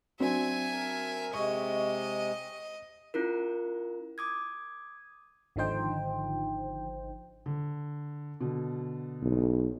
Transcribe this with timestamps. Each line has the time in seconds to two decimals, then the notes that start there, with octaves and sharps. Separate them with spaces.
0.20 F#3 C4 D4 E5 G#5
0.72 A#4
1.34 C3 G#3 D#5 C#6
3.14 C#4 E4 F4 A#4
4.18 D6 D#6 G#6
5.56 G#1 D3 F3 D#4 C5 G5
7.46 D3
8.41 B2 D3
9.22 B1